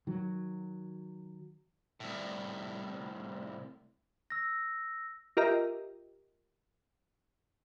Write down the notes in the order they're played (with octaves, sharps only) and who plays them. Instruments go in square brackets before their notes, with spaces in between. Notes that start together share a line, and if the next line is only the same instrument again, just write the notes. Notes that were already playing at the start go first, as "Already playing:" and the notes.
[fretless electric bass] D#3 F#3
[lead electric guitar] C2 A2
[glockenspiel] E6 A#6
[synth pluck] F4 G4 A#4 D#5 E5 A#5